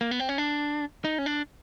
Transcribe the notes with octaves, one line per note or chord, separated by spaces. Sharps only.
A#3
B3
C4
C#4
D4
D#4
C#4
D4